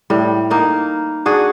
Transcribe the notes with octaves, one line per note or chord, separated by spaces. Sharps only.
A2 G3
A#3 D#4 A#4
D4 F#4 G#4